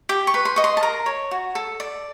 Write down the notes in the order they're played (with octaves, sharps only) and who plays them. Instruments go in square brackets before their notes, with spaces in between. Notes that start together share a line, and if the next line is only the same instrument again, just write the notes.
[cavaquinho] G4 D6
C#6
B4
C6
D#5 C#6
C6
A5
A#4 A#5
C#5
F#4
A4
D5